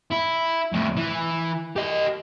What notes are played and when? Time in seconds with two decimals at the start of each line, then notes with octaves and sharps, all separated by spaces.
0.12 E4
0.73 F2 A2
0.97 E3
1.76 G4 D#5